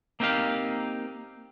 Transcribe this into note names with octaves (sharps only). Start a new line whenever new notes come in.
A#3 C4 D#4 G4 F5